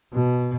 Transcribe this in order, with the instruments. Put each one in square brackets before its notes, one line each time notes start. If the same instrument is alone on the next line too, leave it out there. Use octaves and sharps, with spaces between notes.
[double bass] B2